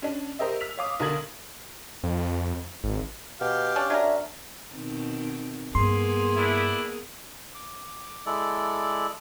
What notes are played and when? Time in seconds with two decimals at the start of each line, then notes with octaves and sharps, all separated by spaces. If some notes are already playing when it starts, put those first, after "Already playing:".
0.02 C#4 D4
0.39 G4 A#4 C5 D#5 E5
0.61 E6 B6 F7
0.77 C#5 F5 D6 D#6
1.00 B1 D3 A#4 D#6 G#6 F#7
2.03 F2
2.84 G#1
3.41 B2 G4 F5
3.76 C#4 D4
3.90 F#3 C#4 D4 A#4 E5
4.73 B2 D#3 C4
5.75 G2 A#3 B3 G#4 C6
6.36 D4 E4
7.55 D6
8.26 G#3 E4 A4 D5